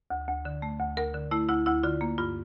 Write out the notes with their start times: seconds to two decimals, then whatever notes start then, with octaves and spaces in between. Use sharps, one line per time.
0.10 D2
0.28 D2
0.45 D3
0.62 A3
0.80 D2
0.97 D2 A#4
1.14 D3
1.31 A3 E4
1.49 D2 E4
1.66 D2 E4
1.83 D3 F4
2.01 A#3
2.18 G2 F4